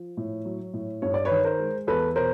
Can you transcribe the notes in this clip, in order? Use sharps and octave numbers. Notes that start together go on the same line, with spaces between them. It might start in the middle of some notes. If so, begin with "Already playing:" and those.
Already playing: F3
A2
F#3
A2
G2 C#5
D5
B4 C#5
D#3
A#4 C5
G#3
E2 A4 B4
B2 A#4 C5